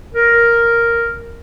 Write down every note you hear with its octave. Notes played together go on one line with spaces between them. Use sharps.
A#4